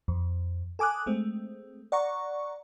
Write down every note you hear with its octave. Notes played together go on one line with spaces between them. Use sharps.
F2
A4 G#5 D6 D#6 F#6
G#3 A3 C4
D5 F#5 A#5 C#6